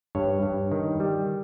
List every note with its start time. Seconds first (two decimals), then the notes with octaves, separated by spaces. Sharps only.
0.15 G2 C#5
0.42 G2
0.72 D#3
1.00 G3